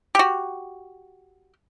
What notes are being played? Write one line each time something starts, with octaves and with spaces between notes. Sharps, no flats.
F#4 G4